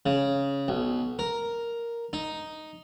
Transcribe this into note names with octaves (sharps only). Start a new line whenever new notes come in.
C#3
B1
A#4
D#4